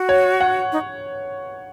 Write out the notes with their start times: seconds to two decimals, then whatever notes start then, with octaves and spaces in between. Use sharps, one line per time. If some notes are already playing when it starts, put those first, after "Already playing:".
Already playing: F#4
0.09 C#5
0.40 F#5
0.72 D#4